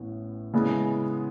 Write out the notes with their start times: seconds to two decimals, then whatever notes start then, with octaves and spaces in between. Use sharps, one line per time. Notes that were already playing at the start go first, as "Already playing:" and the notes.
Already playing: A1 A2 E3 B3
0.53 C#3 E3 G#3 B3 E4